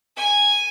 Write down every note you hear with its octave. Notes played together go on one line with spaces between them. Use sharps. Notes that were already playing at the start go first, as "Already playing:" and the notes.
G#5